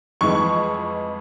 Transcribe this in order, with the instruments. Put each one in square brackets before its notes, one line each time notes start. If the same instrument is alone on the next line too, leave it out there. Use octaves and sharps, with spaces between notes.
[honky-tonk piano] F2 E3 G#3 C#6